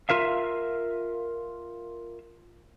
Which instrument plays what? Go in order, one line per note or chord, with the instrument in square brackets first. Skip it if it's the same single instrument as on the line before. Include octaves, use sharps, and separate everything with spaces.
[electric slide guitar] F4 A#4 E5 F5